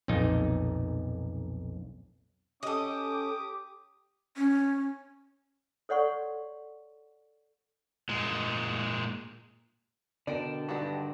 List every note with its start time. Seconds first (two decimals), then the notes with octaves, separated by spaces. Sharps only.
0.08 B1 F2 A#2 D#4
2.63 C#4 G4 A4 D#5 D6 D#6
4.36 C#4
5.89 A4 C#5 D5 F#5 C6 C#6
8.09 A#2 G#3
10.27 B2 D3 A#4 D5 G5 A5
10.69 G2 D#3 G#3 F#4 D5